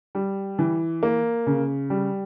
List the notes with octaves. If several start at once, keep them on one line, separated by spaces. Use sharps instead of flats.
G3
E3
A#3
C#3
G3